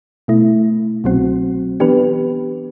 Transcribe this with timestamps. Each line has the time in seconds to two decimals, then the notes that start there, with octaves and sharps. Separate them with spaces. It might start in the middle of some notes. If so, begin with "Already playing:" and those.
0.28 B2 A3 E4
1.04 C2 B2 F#3 C4 F#4
1.80 E3 B3 D4 G4 B4